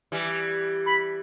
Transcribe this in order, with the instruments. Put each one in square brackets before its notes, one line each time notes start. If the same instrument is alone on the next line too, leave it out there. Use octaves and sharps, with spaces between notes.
[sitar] E3 G3
[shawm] B5